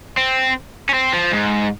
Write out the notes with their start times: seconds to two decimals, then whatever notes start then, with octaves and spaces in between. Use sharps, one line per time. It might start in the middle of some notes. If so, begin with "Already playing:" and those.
0.17 C4
0.89 C#4
0.94 C4
1.13 F3
1.32 G#2